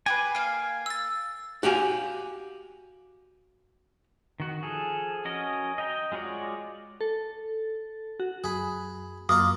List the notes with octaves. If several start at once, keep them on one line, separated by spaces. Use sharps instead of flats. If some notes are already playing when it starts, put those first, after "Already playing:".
G4 G#4 B4 G#5
A#3 F5
E6 A6
F#4 G4 F5 G#5
D#3 F#4
F3 G#4 A4
C#4 F#4 A#4 D#5
D#5 G5 A#5
G#3 F4 F#4 C#5 D5
A4
F#4
F#2 G#4 B5
F#2 A#3 F4 A#5 D#6